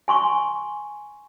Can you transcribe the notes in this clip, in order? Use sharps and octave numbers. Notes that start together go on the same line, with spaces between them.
G#5 C6 C#6